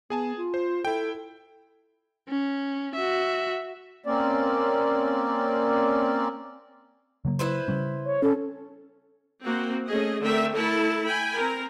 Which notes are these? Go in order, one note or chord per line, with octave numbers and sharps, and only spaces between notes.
B3 G#4 G#5 A5
F4
C5
E4 A4 G5
C#4
F#4 E5
A#3 C4 C#4 D5
C#3 F#3 A#3
E4 B4 C5
C#3 G3 C#4
C#5
C#4 A4
A#3 C4 F#4
A3 C#4 G#4 D#5
D3 A3 C4 A#4 E5 G5
A3 E4 A4 A#4 A5
G5 G#5 B5
C4 A#4